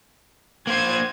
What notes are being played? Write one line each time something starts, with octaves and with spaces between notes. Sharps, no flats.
A#3 C5 G#6 D#7